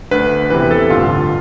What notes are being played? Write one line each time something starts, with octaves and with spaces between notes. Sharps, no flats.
D2 D3 B4
E2 C3 E3 B4
A4
A1 G2 D3 F4